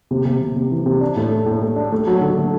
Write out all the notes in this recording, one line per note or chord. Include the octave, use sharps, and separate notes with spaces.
C3
C3
C3
C3
E3
C3
D4
A2
A3
A2
A3
D4
A3
F#3
D3
A3